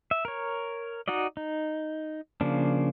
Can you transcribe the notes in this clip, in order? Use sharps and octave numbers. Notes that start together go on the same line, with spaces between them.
E5
A#4 C#5
D#4 F#4 D5 D#5
D#4
C#3 F3 A#3 D4